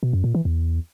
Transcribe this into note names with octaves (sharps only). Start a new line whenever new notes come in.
B2
F#2
A#2
E3
E2